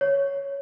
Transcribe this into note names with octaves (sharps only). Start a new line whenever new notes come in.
C#5